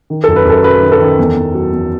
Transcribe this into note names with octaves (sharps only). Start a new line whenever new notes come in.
D#3
F#2 A4
B4
F#2 A4
F#3 B4
D#3
A4
D#3
E2
E2
F#3
E2